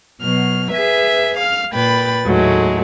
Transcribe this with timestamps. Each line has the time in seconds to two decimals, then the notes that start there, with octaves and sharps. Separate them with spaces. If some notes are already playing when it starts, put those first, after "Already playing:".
0.21 B2 F#3 F6
0.70 G#4 B4 E5
1.38 F5 F6
1.74 A#2 B4 G5 B5 A6
2.25 D#2 A2 F#3 G#3 A3